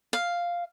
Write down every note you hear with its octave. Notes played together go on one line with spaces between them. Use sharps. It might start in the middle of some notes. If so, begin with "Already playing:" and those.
F5